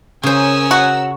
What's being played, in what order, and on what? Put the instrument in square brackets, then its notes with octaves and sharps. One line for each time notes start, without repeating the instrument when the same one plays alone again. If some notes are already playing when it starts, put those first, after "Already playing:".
[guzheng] C#3 C5 [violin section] C#4 A#4 E6 [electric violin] G#5 D#6
[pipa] F#4